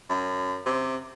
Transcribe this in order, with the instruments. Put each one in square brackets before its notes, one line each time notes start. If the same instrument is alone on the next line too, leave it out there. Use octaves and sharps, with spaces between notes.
[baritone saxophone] F#2
C3